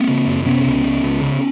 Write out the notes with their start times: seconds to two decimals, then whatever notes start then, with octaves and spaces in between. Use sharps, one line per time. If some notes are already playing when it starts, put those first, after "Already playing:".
Already playing: A#3 C4
0.08 C#3
0.27 F#2
0.46 C3 B3 C#4
0.66 C#2
0.84 C#2
1.03 C#2
1.21 C#3